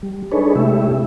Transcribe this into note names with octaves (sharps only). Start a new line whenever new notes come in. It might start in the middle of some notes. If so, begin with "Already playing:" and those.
G3
D4 D#4 G#4 A4 B4 C#5
C3 G#3 A3 E4 G4 E5